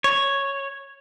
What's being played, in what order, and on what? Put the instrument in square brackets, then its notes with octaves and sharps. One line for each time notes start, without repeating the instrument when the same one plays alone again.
[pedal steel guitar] C#5